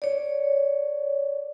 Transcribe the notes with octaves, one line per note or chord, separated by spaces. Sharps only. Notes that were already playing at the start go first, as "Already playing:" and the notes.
C#5 D5